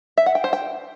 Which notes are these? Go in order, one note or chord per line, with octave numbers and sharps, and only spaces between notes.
E5
F#5
G5
C5
G5